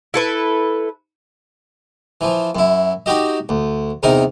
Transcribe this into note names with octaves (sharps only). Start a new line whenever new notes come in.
E4 A4 B4
E3 F3
F#2 E4
D#4 F#4 G4 D#5
D2
E2 C3 D#4 A#4